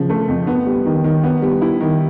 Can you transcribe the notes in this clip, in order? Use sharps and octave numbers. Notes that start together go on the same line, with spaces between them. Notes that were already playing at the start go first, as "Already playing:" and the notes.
Already playing: C#3 F3
A3
F2
B3
G3
D#3
D#3
B3
G3
E4
D#3